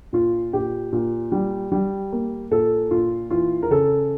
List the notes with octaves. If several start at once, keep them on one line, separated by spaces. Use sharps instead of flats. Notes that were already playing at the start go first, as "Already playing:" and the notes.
A#2 F4
A#2 G4
A#2
G3
G3
A#3
A#2 A4
A#2 F4
E3 F4
A#4
C#3 A4